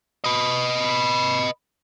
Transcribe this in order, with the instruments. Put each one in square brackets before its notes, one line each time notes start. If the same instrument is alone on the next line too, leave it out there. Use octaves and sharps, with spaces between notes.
[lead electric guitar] B4 D#5